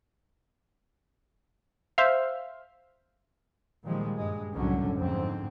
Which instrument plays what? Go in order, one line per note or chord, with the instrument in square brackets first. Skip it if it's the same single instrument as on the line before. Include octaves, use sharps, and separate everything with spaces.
[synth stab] C5 E5 F5
[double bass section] A#2 D#3 F3 G3 G#3
G2 G#3
F#1 C2 A2 D3 F#3 C#4
F2 G#2 D3 C4